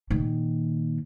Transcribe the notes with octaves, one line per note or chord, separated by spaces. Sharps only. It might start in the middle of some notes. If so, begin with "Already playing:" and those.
A#2 D#3